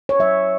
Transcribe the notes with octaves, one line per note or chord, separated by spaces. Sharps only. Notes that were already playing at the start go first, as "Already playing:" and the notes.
C#5
F#3 E5